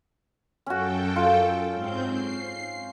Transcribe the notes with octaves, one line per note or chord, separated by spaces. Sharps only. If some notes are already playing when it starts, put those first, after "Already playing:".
F#2 C#4 F#4 A4 G5
F4
G#2 C4 G6
C7